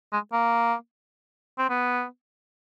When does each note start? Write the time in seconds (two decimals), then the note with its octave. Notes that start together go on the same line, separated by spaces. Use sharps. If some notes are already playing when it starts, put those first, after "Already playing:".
0.13 G#3
0.33 A#3
1.58 C4
1.69 B3